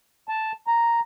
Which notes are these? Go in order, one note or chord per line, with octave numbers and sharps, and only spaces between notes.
A5
A#5